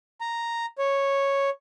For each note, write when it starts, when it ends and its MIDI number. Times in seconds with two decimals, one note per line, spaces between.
0.21 0.66 82
0.78 1.50 73